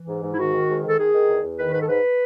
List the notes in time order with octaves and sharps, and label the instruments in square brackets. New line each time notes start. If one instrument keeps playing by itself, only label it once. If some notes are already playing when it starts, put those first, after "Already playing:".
Already playing: [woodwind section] E3
G#2
G#2
E4
D#3 F#4
D#3
G#2
D#3 A4
D#3 G#4
D#3
E2
E2
D#3 B4
G#2 B4
A4
G#2 B4